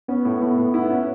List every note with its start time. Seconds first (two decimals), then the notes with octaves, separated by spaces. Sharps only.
0.08 B3 C#4
0.25 A2
0.42 A2
0.58 A2
0.74 E4
0.90 C#4